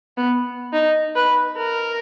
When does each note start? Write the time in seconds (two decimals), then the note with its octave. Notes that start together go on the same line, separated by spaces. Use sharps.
0.17 B3
0.73 D#4
1.16 B4
1.57 A#4